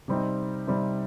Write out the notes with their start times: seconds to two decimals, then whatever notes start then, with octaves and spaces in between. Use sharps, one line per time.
0.08 C3 G3 C4 D#4
0.67 C3 G3 C4 D#4